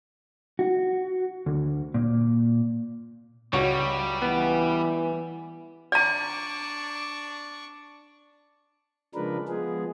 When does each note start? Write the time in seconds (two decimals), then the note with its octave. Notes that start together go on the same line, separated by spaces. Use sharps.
0.59 F#4
1.46 D2
1.94 A#2
3.53 C#2 G3 F#4 C#5 C#6
4.22 E3 B3
5.92 D4 D5 A#5 C#6
9.15 C#3 F3 G#3 D4 A#4 B4
9.49 F3 G#3 B3 G#4